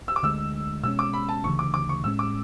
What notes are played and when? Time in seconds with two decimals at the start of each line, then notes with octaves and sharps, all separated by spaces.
0.08 E6
0.16 D6
0.23 D2 D3 G#3 E6
0.84 B2 G#3 C#4 E6
0.99 D6
1.13 B5
1.29 A5
1.44 D2 C#3 E3 C#6
1.59 D6
1.74 D6
1.89 C#6
2.04 A2 G#3 C#4 E6
2.19 D6